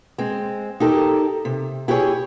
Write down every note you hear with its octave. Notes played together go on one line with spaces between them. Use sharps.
G#3 C4
D#4 G4 A4 A#4
C3
E4 G4 G#4 A#4 C#5